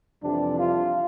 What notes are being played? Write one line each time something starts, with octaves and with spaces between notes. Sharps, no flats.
F2 C3 E3 G3 D4
F4